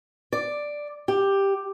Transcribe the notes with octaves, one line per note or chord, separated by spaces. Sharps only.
D5
G4